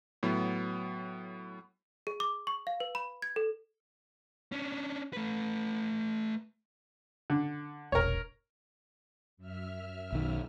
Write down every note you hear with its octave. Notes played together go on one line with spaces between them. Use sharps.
A2 F#3 B3
G#4
D6
C#6
F5
B4
B5
G#6
A4
C#4 D4
A3 B4
D3
E1 A#1 A#4 C#5
F#2 E5 F6
B1 D#3